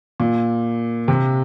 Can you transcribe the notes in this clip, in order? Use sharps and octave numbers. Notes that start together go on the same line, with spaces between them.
A#2
C3